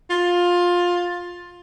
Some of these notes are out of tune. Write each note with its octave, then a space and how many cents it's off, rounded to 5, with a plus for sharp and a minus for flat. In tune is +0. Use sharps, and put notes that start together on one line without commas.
F4 +15